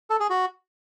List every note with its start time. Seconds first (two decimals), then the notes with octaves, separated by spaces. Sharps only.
0.10 A4
0.20 G#4
0.30 F#4